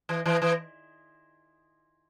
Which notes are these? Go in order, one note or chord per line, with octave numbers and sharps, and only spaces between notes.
E3
E3
E3